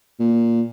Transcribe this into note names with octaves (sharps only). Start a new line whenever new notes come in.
A#2